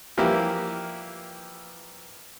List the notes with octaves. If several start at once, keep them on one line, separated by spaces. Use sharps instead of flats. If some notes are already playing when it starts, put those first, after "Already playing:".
E3 F3 G3 A#3 E4 G4